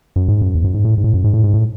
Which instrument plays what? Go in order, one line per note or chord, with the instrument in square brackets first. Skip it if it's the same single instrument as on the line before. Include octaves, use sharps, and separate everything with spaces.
[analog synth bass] F#2
G#2
F#2
E2
F#2
G#2
A2
G#2
A2
F#2
G#2
A2
G#2
A2